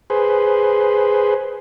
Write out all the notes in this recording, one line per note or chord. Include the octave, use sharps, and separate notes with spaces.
G#4 B4 C5